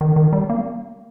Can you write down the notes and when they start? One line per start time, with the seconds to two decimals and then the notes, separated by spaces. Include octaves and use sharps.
0.01 D#3
0.16 D#3
0.33 G3
0.50 A#3